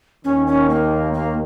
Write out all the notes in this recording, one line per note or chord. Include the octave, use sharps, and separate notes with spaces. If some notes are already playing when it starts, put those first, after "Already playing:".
D#2 D#3 C#4
C#4
A#3
A#3